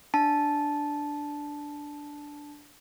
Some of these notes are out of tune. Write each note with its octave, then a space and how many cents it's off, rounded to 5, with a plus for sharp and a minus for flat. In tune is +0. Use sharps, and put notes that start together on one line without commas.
D4 +0 A5 -10